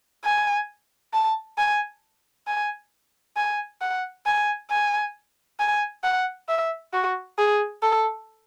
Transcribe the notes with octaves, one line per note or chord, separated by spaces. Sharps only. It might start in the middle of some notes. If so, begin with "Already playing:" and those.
G#5
A5
G#5
G#5
G#5
F#5
G#5
G#5
G#5
F#5
E5
F#4
G#4
A4